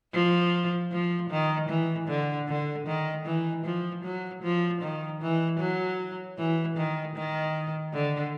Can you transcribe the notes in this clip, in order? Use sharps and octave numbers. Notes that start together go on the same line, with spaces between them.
F3
F3
D#3
E3
D3
D3
D#3
E3
F3
F#3
F3
D#3
E3
F#3
E3
D#3
D#3
D3